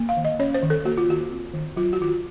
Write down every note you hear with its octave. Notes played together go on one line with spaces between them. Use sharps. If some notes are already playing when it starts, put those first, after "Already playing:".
Already playing: A#3
F5
D#3
D#5
C#4 C#5
C5
D#3
A4
A#3 F#4
F4
D#3 F#4
C4
D#3
F#3 F4
F#4
D#3 F4
F#4